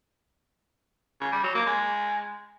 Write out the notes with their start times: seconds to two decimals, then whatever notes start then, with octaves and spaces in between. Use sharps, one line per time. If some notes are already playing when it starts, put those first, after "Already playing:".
1.21 C#3
1.32 G3
1.43 F#3
1.55 A#3
1.66 G#3